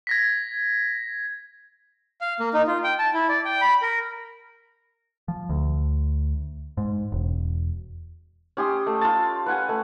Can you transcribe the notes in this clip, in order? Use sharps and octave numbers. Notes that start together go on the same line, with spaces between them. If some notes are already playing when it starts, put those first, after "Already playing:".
G#6 A#6 B6
F5
A#3
D#4
F4
G5
A5
E4
D5
G5
B5
A#4
F3
D2
G#2
E1
C#4 G4 C6 D#6
A3
F4 A5
B4 F#5 G#5
A3